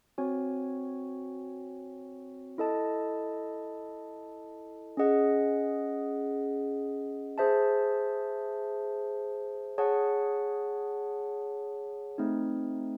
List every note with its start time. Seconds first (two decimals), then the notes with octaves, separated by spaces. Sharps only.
0.18 C4 F#4 C#5 G#5
2.58 E4 A4 D#5 A5
4.97 C#4 G#4 D#5 F#5
7.38 G#4 C5 E5 A5
9.78 G#4 C#5 F#5 A5
12.18 A3 C4 D#4